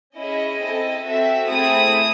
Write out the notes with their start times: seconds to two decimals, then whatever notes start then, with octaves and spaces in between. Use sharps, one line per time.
0.16 C#4 E4 G#4 D#5
0.61 C4 E4 A4
1.05 C4 F#4 A4 E5
1.50 A3 C4 E4 G#4 D#6